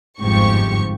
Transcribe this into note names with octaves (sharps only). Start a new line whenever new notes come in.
G1 F2 G#2 F3 G4 C#6